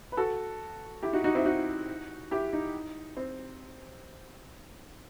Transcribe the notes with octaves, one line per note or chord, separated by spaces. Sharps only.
B4
F#4 A4
E4 G4
D#4 F#4
D#4 F#4
C4 E4
D#4 F#4
E4 G4
D#4
C4